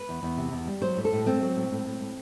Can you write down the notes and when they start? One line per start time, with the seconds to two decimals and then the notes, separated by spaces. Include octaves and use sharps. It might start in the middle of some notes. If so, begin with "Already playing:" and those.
Already playing: B4
0.09 E2
0.23 E2
0.37 C3
0.52 E2
0.67 G3
0.82 F#3 C5
0.97 A2
1.05 A4
1.12 A2
1.26 A3 C4
1.42 F#3
1.56 A2
1.72 A2
1.86 A2
2.01 A2